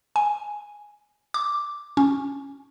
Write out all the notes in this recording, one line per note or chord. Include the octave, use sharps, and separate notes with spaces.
G#5
D6
C#4